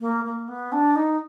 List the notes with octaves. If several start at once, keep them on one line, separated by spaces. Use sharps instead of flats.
A#3
A#3
B3
D4
D#4